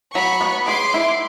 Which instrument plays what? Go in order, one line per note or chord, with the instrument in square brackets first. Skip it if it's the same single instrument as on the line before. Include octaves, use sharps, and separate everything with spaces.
[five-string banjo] F#3 [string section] B5 C#6
[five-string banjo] B3
[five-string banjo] G#4 [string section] C6 D6
[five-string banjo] E4